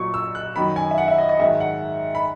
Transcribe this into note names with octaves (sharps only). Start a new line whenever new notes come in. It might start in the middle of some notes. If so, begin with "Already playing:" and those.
Already playing: A#2 F#3 C#6
E6
F#6
F#2 D#3 F#3 B5
G#5
E5
F#5
E5
D#5
D#5
G#2 D#3 F#3 E5
F#5
B5